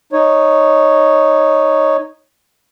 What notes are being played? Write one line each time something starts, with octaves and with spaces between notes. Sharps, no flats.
D#4 C#5